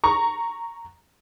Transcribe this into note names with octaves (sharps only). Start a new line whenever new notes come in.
A#5 C#6